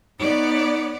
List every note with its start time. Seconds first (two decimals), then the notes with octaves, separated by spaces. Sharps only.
0.20 B3 D#4 C#5 D5